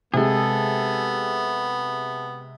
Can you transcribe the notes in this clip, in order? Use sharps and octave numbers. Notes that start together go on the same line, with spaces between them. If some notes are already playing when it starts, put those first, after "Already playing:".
C3 G#3 B3 G#4 A4